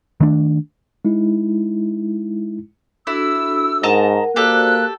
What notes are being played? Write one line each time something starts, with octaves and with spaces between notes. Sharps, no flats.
D#3 A3 D4
G#3 D#4 E4
D4 E4 F#4 A4 E6
G#2 A#4 D#5 F#5 A5 A#5
A#3 F#4 G4 A4 C5 D5 F#6